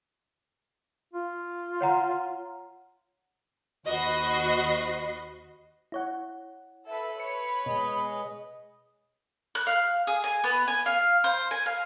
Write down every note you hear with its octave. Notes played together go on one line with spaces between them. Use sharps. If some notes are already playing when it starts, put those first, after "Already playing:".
F4
C#5 F#5 A#5
D#2 F#4 C5 D#5 B5 C7
E4 C#5 F#5
A4 B4 E5
B4 C#5 B5 C#7
B2 G#3 G#4 D#5
F#6
F5
G#4
G#5
B3
G#5
F5
C5
G#5
F5